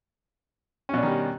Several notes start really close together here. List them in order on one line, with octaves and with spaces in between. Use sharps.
C#4 B2 D4 D#3 G3